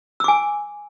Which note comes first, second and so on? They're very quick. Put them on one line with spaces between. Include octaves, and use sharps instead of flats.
E6 D6 G#5